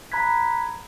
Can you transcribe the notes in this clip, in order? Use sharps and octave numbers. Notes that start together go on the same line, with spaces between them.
A#5 B5 F#6 G#6 B6